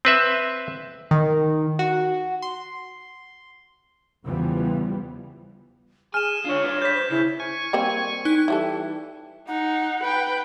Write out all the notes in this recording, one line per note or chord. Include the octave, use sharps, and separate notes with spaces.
C4 B4 E5
D#3
F#4
C6
E2 C#3 E3 F3 G3 B3
G#4 G#5 F6 E7
D4 F4 C#5
D4 B4 C#5
C#5 G6 B6
C5
C#3 E4
G#5 C#6
G3 A#3 C4
D#4 F#6
E3 G3 A4
D#4 F#5
B4 G5